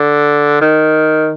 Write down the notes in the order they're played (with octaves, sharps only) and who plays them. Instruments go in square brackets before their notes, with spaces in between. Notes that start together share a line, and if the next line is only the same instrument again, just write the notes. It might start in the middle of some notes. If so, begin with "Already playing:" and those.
Already playing: [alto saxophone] D3
D#3